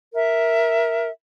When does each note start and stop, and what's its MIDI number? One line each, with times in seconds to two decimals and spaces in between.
0.13 1.09 70
0.13 1.09 76